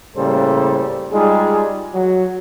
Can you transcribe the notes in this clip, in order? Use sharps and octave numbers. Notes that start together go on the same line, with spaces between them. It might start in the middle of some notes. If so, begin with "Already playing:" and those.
A2 C#3 G3 A#3 A4 C5
G3 G#3 D#4 F4 G#4
F#3